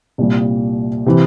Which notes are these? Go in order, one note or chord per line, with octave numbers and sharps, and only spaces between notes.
C2 A#2 G3
C3 E3